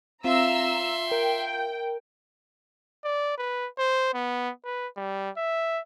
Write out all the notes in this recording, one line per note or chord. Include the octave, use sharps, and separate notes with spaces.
C4 F4 E5 A#5 C6 E6
A#4 G5
D5
B4
C5
B3
B4
G3
E5